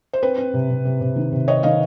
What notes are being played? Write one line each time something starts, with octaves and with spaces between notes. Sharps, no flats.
C5
C4 B4
C4
C3
C3
C3
C3
D#3
C3
C4 C#5 D#5
D#3 D#5 F5